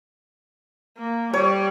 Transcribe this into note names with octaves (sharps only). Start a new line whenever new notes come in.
A#3
G3 C#5